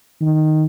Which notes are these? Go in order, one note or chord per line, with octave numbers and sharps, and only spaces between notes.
D#3